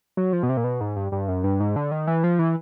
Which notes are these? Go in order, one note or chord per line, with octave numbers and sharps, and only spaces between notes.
F#3
F3
B2
C3
A#2
B2
G#2
G2
G2
F#2
G2
G#2
D3
D#3
E3
F3
E3